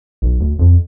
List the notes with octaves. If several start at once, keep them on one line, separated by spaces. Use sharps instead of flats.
B1
D2
F2